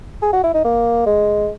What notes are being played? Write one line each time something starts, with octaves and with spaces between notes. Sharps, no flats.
G#4
F#4
E4
D#4
A#3
G#3